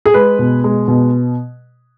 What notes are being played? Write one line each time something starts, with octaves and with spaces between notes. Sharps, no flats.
G#4
G#3 B4
B2
G#3
B2